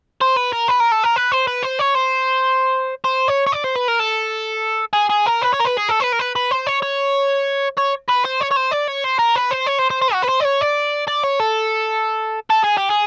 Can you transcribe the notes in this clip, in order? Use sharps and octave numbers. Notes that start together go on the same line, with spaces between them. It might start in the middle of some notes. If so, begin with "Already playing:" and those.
C5
B4
A#4
B4
A#4
A4
A#4
B4
C5
B4
C5
C#5
C5
C5
C#5
C#5
D5
C5
B4
A#4
A4
G#4
G#4
A#4
B4
C#5
A#4
B4
G#4
A4
C5
B4
A#4
B4
B4
C5
C#5
C#5
C#5
B4
C5
C#5
C#5
C5
D5
C#5
C5
A#4
B4
C5
C#5
C5
C5
C5
F#4
B4
C5
D5
C#5
D5
D5
C#5
A4
A4
G#4
G4
G#4